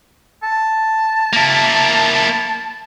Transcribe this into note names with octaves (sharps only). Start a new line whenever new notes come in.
A5
A#3 E4